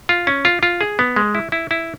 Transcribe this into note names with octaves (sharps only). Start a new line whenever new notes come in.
F4
C#4
F4
F4
G#4
B3
G#3
E4
E4
E4